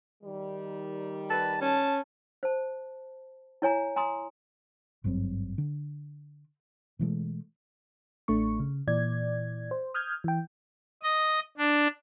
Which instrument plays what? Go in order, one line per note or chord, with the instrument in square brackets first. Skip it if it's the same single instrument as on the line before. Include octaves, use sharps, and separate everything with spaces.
[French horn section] D#3 G3
[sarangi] B4 [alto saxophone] A5
[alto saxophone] C#4 [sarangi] A5
[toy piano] C5 A5
E4 C#5 G#5 A#5
G#5 A#5 C6 D#6
[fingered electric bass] G#1 G2 F#3 C4
D3
B2 E3 G#3 A3
[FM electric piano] A1 A3 D4 C#6
C#3
A#2 E3 D5 G#6
C5
D#6 F6 G6 G#6
E3 G5
[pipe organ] D#5
D4